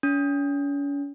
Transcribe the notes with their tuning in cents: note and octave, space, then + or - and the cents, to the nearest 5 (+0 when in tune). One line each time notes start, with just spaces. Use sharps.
C#4 +40